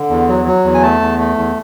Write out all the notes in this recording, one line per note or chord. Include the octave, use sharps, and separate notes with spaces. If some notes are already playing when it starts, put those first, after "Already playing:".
Already playing: D3
E2
F#3
F#3
E2
G#5
A3 A5
E2
A3
E2